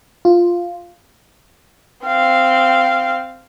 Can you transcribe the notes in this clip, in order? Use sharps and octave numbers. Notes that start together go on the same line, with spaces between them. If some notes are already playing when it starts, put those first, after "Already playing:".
F4
C4 F5